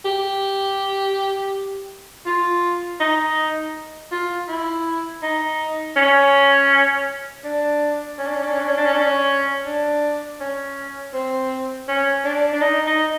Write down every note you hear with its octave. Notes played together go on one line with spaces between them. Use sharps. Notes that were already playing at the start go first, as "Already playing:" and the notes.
G4
F4
D#4
F4
E4
D#4
C#4
D4
C#4
D4
C#4
D4
C#4
D4
C#4
D4
C#4
D4
C#4
D4
C#4
C4
C#4
D4
D4
D#4
D#4